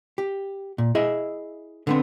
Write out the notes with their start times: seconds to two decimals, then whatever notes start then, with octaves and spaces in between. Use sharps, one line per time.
0.18 G4
0.78 A#2
0.95 E4 G#4 D#5 E5
1.87 D3 B3 C4